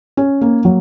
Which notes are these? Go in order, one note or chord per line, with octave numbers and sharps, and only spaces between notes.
C#4
A#3
F#3